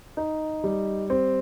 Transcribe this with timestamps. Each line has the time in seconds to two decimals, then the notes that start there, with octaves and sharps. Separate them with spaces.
0.17 D#4
0.64 G3
1.10 C4